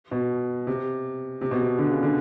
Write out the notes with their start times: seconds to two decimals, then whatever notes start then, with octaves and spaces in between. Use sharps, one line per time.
0.11 B2
0.67 C3
1.41 C3
1.51 B2
1.61 C3
1.78 D3
1.91 C#3
2.03 D3